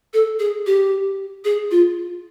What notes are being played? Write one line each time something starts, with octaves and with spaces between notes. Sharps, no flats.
A4
G#4
G4
G#4
F4